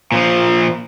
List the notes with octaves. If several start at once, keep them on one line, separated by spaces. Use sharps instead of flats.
A#2 F3